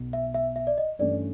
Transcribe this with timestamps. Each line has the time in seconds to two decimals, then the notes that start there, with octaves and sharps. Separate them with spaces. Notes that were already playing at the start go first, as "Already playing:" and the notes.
Already playing: B1 B2
0.13 E5
0.34 E5
0.56 E5
0.67 D5
0.78 D#5
0.99 G2 E3 A3 C#4 D5